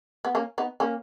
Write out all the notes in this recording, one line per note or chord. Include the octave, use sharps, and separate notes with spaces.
B3
A#3 C#4
B3 D#4
A#3 C#4